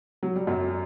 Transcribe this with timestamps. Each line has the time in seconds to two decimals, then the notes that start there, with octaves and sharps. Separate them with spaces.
0.23 F#3
0.36 G3
0.47 F#2 F#3